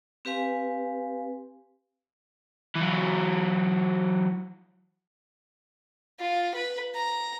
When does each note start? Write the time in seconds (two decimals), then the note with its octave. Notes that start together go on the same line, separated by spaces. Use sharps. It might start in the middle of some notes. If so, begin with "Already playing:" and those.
0.25 C4 G4 B4 F5 G#5
2.75 E3 F#3
6.20 F4
6.55 B4
6.94 A#5